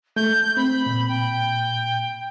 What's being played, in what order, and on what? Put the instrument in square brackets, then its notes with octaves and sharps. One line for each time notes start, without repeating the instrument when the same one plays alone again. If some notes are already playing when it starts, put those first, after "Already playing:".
[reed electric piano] A3 [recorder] G6
[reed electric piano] C4 [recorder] B5
[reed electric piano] A#2
[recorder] G5